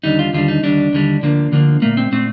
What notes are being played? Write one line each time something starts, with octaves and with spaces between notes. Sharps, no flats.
D#2 D3 G3 D#4
F4
D#2 D3 G3 F4
D#4
D#2 D3 G3 D4
D#2 D3 G3
D2 D3 F3 A#3
D2 D3 F3 A#3
A#2 A3 A#3
C4
A#2 A3 C4